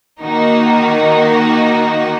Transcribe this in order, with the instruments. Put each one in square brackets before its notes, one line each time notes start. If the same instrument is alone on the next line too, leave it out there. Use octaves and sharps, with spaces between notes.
[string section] D#3 A#3 D#4 F#4